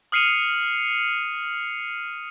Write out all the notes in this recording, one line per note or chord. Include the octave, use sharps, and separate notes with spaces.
D#6 F6 C7 C#7 D#7 F7